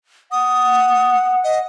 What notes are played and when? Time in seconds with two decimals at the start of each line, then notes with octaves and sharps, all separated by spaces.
0.32 F#5 D#6
1.44 D#5